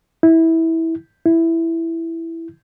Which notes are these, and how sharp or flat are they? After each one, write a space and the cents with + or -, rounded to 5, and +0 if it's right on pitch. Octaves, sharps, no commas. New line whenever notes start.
E4 -20
E4 +0